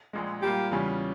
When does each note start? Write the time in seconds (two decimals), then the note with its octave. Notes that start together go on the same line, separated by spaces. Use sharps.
0.13 A#1 A#2 G#3
0.42 A#2 G3 A#3 F4 G4
0.71 E2 C#3 G3 C#4 F4